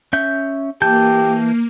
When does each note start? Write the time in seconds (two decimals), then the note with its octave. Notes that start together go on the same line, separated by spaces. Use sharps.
0.13 C#4 E5 G6
0.82 E3 A#3 G4 A5 G6